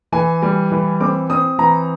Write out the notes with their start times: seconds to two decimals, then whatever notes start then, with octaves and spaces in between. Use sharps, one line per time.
0.12 E3 G#5
0.42 G3
0.72 E3
1.00 C4 D6
1.30 C4 D#6
1.58 E3 A#5